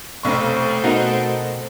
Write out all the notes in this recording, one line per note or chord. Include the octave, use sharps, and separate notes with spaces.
F1 B1 A3 C4 A4 C#6
B2 D#4 F#4 A#4 D#5